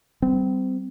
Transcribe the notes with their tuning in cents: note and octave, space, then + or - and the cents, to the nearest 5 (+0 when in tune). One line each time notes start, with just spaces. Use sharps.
G3 -25 C4 -30